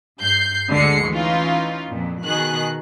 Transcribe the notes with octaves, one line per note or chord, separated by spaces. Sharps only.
G2 G6 C7
D2 D3 G#3 C7 C#7
E3 C#4 D#4 F4
F2 A#2
B2 D#3 G#4 F#6